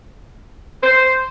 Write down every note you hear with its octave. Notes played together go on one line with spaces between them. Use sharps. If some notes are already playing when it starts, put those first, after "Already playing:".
C5